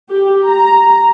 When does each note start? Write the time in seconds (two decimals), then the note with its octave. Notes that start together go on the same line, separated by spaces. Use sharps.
0.10 G4
0.48 A#5